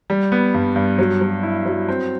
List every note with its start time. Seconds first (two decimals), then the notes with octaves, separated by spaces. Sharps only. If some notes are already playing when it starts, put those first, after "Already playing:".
0.10 G3
0.32 B3
0.54 G2
0.76 G2
0.98 F#3
1.21 F#3
1.43 E4
1.66 F#3
1.89 C4